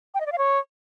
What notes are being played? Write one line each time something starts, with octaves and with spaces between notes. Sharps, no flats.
G5
D#5
D5
F5
C#5